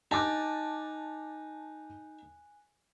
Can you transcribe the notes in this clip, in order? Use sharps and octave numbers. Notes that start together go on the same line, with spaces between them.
D#4 G#5 A5 D6 F#6